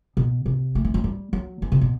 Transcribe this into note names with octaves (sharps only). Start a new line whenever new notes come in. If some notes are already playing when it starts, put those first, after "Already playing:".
B2
C3
A3
E3
F#3
G3
F#3
E3
C3
B2